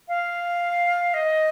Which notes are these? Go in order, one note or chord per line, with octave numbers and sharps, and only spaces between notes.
F5
D#5